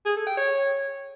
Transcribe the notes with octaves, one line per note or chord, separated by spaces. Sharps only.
G#4
A4
G5
C#5